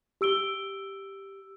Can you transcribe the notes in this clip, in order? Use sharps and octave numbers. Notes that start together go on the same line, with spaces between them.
G4 E6 D7 G7